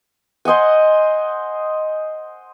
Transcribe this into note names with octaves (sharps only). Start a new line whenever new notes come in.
C5 D#5 F#5 G#5